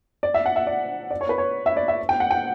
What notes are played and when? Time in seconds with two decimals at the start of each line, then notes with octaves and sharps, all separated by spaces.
0.23 D5
0.34 E5
0.46 F#5
0.56 E5
0.67 D5
1.11 D5
1.21 C#5
1.29 B4
1.38 C#5
1.66 E5
1.77 D5
1.88 E5
2.09 G5
2.20 F#5
2.31 G5